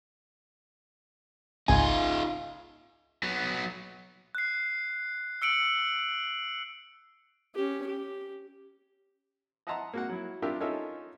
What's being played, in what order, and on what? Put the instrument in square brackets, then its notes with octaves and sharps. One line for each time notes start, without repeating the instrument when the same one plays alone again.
[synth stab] G#1 C#2 G#5 [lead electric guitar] D#4 F4
[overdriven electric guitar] F#3 B3
[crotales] F#6 C7
E6 C#7 D7 F#7
[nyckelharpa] C#4 G4
G4
[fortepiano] D#5 E5 F#5 A5 A#5 C6
A#3 F#4 F#5
F#3 E4
D4 F4 G4 A#4 E5
C#4 D#4 F4 A4 A#4 E5